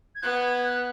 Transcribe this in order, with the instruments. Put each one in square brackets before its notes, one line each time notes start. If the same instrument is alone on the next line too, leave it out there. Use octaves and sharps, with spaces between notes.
[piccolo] G#6
[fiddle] B3 [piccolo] F#6
[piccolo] G#6
G#6
F#6